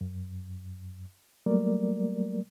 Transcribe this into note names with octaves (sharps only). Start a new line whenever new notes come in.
F#2
F#3 G3 A3 A#3 A#4 D5